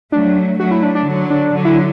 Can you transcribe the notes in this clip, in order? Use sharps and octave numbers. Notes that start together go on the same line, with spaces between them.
F#3 A3 D4
F#3 A3 F#4
E4
D4
D4
D3 F#3
D4
D3 F#3
E4